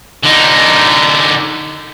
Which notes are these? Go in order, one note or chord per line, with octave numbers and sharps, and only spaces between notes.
D3 D#4